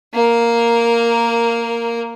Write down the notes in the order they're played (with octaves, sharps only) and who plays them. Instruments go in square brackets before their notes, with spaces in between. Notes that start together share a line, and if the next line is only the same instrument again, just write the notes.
[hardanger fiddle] A#3 A#4